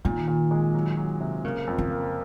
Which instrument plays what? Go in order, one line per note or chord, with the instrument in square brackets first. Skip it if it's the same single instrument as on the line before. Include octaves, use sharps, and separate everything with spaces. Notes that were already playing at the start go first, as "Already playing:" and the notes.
[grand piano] A#2 [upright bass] D#3
[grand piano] A#2
G#3
F#3
F#3
C3
[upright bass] C#3 [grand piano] A#3
[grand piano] F2
[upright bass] C#3
[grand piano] A#3